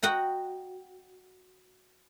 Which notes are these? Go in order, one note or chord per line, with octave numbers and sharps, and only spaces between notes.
F#4 D#5 F#5 G5 A#5